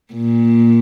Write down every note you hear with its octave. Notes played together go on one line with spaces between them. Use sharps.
A#2